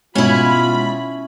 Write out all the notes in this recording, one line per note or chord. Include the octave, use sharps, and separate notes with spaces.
G#2 B2 C#4 E4 F4 B5